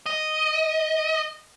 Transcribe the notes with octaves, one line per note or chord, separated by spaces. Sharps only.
D#5